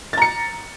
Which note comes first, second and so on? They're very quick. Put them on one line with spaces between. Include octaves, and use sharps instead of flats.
A6 A#5 C#7